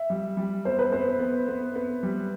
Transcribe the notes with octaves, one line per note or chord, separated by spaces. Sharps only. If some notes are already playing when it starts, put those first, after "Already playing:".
Already playing: E5
G3
G3
B3 C5
B4
B3 C5
B3
B3
B3
G3